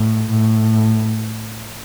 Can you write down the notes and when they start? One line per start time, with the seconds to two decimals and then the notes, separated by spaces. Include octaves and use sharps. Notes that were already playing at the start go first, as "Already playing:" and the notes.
Already playing: A2
0.30 A2